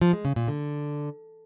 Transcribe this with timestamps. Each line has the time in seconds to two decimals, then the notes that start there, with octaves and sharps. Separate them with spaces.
0.01 F3
0.13 G#3
0.25 C#3
0.36 A#2
0.48 D3